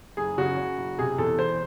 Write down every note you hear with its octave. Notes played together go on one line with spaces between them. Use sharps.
F#1 G#4
C#3 F#4
C#3
F#1
C3 G#4
E2 A4
E1 C5